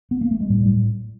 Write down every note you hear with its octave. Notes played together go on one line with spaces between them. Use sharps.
B3
A#3
A3
G#3
A2 G3
A2 G3